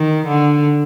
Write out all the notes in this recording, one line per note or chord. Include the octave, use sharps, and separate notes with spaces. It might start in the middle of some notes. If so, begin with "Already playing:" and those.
Already playing: D#3
D3